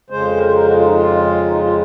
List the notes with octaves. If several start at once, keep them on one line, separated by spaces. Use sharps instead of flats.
F2 C#3 G#3 C5
A#4
C5
A#4
F#4
F4
D#4
F4
D#4
F4